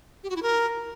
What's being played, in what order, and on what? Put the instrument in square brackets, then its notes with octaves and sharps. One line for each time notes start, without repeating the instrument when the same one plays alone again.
[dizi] G4
F#4
E4
A#4